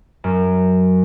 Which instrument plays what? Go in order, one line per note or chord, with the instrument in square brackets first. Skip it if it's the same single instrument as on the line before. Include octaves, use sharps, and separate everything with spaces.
[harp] F#2